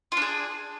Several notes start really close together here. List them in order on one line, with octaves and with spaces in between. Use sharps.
F4 D4 G#4